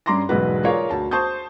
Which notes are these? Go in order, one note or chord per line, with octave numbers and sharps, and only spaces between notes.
G2 C#4 A#5 C6 D6 A#6
E1 B1 G#2 G#3 F#4 B4
F4 G#4 A#4 C#5 D5 F5
D2 A5
C5 A5 C#6 D#6 G6